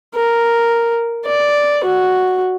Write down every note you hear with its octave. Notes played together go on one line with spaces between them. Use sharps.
A#4
D5
F#4